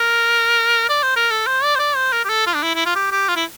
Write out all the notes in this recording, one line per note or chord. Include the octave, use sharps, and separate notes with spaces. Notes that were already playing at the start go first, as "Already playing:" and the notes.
Already playing: A#4
D5
C5
A#4
A4
C5
D5
C5
D5
C5
A#4
G4
A4
F4
D4
E4
E4
F4
G4
G4
F4
E4